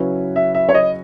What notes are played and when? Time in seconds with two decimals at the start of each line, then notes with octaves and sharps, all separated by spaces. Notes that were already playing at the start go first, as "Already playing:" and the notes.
Already playing: C#3 F#3 C#4 E4 B4
0.36 E5
0.55 E5
0.69 C#5
0.74 D#5